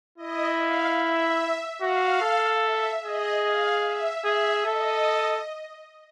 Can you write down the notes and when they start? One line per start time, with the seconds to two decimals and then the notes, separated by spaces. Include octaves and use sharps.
0.17 E4 D#5
0.58 F5
0.99 E5
1.81 F#4 F5
2.22 A4
2.62 E5
3.03 G#4 D#5
3.43 F5
3.84 E5
4.25 G#4 E5
4.66 A4 D#5